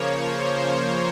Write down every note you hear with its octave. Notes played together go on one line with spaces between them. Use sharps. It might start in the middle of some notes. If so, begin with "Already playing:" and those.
Already playing: C#3 F3 A#3 C#5
C5